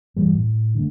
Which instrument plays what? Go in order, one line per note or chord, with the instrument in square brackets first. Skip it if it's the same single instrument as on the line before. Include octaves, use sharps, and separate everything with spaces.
[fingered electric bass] G#2 E3 G3
A2
D3 G#3 A3